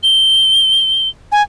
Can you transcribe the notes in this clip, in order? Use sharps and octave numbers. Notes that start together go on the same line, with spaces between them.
G7
G#5